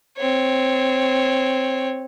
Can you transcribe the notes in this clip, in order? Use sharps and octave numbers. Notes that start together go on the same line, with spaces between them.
C4 C#5